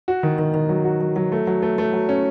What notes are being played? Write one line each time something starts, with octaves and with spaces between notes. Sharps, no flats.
F#4
D#3
D#3
D#3
F#3
F#4
F#3
F#3
A3
F#3
A3
A3
F#3
C#4